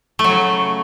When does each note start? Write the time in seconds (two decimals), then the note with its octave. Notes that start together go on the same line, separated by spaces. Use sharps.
0.19 A3
0.24 F#3
0.30 C#3